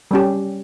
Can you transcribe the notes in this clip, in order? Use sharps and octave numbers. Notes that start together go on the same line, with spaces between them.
G3 C#4 G4